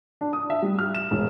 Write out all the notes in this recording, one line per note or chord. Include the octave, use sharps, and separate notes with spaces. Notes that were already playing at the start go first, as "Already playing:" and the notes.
D4
D#6
E5
G3
F6
E7
E1